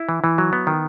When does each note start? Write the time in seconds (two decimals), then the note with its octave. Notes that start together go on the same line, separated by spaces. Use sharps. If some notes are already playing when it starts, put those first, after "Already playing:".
Already playing: E4
0.09 E3
0.24 E3
0.38 F#3
0.53 B3
0.67 D#3